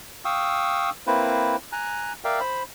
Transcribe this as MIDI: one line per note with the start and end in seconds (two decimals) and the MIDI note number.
0.25 0.90 77
0.25 0.90 79
0.25 0.90 85
0.25 0.90 87
0.25 0.90 88
1.07 1.56 58
1.07 1.56 60
1.07 1.56 64
1.07 1.56 71
1.07 1.56 72
1.72 2.13 80
1.72 2.13 82
1.72 2.13 90
2.24 2.40 70
2.24 2.40 74
2.24 2.40 76
2.24 2.40 77
2.24 2.40 79
2.40 2.63 72
2.40 2.63 83